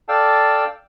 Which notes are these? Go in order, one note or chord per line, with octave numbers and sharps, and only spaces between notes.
A4 D5 F5 G5 A5